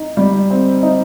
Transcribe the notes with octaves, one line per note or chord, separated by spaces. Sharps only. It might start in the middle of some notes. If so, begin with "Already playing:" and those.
Already playing: D#4
G3
C4
D#4